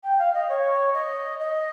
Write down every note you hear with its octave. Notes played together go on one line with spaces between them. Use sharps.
G5
F5
D#5
C#5
D#5
D#5